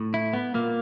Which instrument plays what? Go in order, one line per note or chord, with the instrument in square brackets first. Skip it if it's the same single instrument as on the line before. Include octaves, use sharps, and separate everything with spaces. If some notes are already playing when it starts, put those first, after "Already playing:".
Already playing: [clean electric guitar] A2
[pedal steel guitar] E4
B3
[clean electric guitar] A#2 [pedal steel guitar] A#3